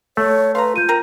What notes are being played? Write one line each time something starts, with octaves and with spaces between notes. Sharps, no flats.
A3 C#5
B4 F5 A#5 C6
F4 G6 D#7
C4 A#4 A#5